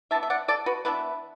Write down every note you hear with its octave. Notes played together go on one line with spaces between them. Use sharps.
E3 B3 D4 E5 A5
E5
D5 F#5
A4 D5
F#4 B4
E3 B3 D4 B4 E5